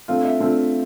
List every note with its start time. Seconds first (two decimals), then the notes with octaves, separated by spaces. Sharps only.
0.08 D3 A3 C4 F4 F5
0.25 E5
0.40 D3 A3 C4 F4